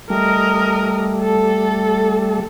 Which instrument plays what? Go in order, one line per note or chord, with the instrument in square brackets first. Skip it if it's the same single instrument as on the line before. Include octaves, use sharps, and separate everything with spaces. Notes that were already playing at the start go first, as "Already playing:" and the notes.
[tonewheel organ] G3 A3 [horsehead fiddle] A#4 D#5
[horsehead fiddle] A4